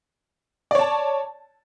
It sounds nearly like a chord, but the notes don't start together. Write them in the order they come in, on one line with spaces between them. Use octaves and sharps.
D5 C#5 A5